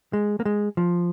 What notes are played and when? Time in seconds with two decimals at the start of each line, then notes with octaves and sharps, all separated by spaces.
0.13 G#3
0.40 A#3
0.45 G#3
0.77 F3